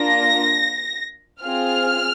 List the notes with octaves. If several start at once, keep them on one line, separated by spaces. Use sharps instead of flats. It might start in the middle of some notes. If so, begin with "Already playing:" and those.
Already playing: A#3 D4 F4 A#6
C4 F4 G#4 F6